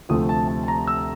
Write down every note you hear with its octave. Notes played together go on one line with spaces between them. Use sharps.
D2 C3 F3 A3 D#6
A5
A5
A5
A#5
E6